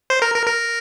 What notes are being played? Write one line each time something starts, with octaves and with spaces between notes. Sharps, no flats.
C5
A#4
A#4
A#4